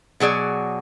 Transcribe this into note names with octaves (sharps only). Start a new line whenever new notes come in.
B2 F#3 G#4 D5